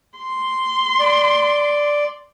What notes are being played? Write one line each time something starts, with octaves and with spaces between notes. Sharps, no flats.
C6
D5